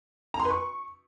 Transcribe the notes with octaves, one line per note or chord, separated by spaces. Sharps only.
A#5
C6
B4
C#6